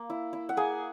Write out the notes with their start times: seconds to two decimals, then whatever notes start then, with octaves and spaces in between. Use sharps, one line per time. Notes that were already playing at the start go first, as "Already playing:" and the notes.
Already playing: A#3
0.10 E4
0.33 E4
0.49 F#5
0.57 A#3 G#4 G#5